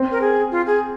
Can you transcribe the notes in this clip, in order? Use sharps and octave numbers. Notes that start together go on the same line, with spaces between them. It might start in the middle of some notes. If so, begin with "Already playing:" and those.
Already playing: C4
A#4
G#4
F4
G#4